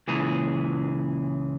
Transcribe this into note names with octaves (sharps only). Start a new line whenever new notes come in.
C#2 A#2 E3 G#4